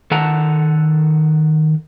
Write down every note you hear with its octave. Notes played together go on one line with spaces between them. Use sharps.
D#3 A4 F#5 A5 A#5